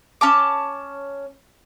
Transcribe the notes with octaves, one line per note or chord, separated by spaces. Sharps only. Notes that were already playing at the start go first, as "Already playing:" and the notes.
C#4 A5 D6